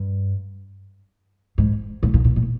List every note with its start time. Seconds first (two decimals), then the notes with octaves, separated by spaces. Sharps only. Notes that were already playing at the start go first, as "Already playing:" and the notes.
Already playing: G2
1.58 G#2
2.03 A2
2.14 A#2
2.24 A#2
2.36 A#2